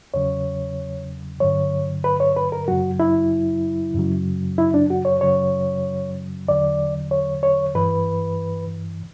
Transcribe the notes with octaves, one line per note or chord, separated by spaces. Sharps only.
E2 C#3 F#3 C#5
G2 D3 F#3 C#5
B4
C#5
B4
A#4
F#2 C#3 F#3 F#4
E4
F#2 C#3 F#3
E4
D4
F#4
C#5
F#2 C#3 F#3 C#5
E2 D3 F#3 D5
C#5
C#5
G2 E3 B4